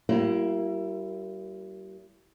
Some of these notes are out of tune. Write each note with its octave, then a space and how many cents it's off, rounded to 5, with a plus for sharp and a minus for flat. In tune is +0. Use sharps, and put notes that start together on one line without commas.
G3 -40 A#3 +0 E4 +25